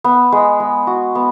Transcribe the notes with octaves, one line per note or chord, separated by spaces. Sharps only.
B3
G#3
G#3
F#4
B3